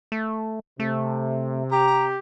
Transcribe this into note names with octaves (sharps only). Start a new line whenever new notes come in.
A3
C3 A3
G4 A#5